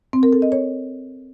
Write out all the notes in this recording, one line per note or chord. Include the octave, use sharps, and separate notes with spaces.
C4
A#4
A4
D#5
C#5